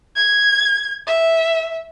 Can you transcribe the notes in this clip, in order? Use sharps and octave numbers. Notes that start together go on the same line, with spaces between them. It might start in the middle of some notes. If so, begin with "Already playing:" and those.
G#6
E5